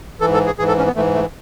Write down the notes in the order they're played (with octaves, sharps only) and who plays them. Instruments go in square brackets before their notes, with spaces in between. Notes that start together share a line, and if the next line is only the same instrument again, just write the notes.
[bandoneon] G#2 E3 A4
A4
G#4
G#2 E3 G#4
A4
C#4
B3
G#2 E3 A3
A3